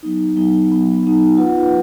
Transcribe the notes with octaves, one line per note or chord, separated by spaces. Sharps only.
F#3 B3 D#4
F#3 B3 D#4
F#3 B3 D#4
F#3 B3 D#4
F4 B4 F#5